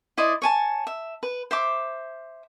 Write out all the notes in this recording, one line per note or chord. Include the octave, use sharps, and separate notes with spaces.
E4 C5 D5 D#5
C#5 G#5 A5
E5
B4
C5 E5 D6